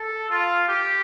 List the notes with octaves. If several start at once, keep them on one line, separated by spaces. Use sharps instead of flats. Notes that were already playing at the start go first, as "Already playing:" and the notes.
Already playing: A4
F4
G4